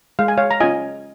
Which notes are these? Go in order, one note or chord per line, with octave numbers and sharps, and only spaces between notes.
G#3 F5
G#5
C#5 F5
A#5
C#4 F4 D#5 G#5